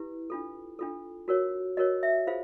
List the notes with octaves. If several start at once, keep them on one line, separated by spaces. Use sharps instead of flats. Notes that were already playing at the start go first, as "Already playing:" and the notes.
Already playing: E4 G4 B4
D4 F4 A4
D4 F4 A4
F#4 A#4 C#5
F#4 A#4 C#5 D#5
E5
F4 G#4 C5 F5